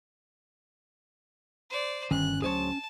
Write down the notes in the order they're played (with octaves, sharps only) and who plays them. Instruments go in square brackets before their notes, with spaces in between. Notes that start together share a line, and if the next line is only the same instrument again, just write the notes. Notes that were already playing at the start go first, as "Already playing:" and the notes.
[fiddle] C5 D5
[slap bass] G1 G2 [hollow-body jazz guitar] D#3 [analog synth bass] C#4 [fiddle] F#6
[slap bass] D2 E3 F#3 [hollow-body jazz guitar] G#4 C5 C#5 [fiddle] A5